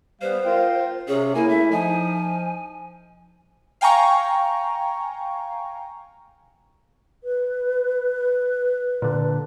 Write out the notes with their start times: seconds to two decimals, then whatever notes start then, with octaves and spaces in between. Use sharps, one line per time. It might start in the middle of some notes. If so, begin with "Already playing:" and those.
0.21 G3 B3 B4 C5 F5
0.45 F4 A#4 F5 G5
1.08 C3 C#4 G#4
1.35 A#3 E4 G#5
1.49 A3 E5
1.71 F3 D#4 G#5
3.81 F5 G5 G#5 A#5 C#6
7.24 B4
9.02 A#2 D3